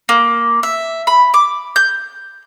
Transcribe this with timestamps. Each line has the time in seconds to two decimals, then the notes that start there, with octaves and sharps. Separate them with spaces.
0.09 A#3
0.63 E5
1.07 B5
1.34 D6
1.76 G6